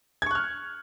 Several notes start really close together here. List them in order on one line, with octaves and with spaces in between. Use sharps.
G#6 C#6 F#6 F6